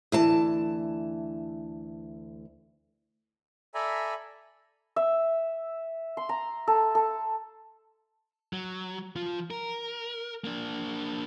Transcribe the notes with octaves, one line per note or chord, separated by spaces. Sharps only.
D2 E3 A5
A4 D5 E5 G#5 A#5 B5
E5
C6
A#5
A4
A4
F#3
F3 F4
A#4
A#3 D4